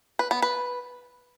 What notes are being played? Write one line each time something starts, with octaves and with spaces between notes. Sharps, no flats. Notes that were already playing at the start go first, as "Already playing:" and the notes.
B4
B3
B4